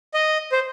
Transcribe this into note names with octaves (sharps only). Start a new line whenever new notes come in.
D#5
C5